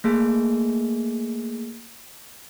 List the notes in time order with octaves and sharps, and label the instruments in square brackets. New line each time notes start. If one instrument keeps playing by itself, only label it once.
[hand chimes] A3 A#3 G#4